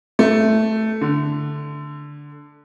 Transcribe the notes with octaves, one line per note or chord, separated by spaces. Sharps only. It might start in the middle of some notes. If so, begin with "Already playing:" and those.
A3
D3